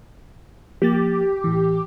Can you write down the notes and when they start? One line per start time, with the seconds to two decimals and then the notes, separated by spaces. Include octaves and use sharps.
0.82 F3 A#3 G4 A6
1.44 A2 E3